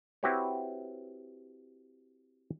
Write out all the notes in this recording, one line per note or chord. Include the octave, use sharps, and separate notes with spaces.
C4 E4 F#4 G4 B4 C#5